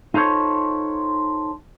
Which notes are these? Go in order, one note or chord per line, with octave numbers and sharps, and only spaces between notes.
D#4 F4 A4 C5 C#5